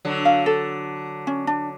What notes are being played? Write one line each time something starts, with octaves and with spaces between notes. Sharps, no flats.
D3 F#3
F5
A4
C#4
D4